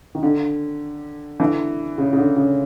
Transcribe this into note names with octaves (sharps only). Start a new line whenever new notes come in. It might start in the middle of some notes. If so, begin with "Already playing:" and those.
D#3
D3
D3 E3
C#3
C#3
D3
C#3